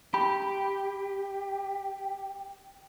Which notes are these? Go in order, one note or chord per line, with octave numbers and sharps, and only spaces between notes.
G4 B5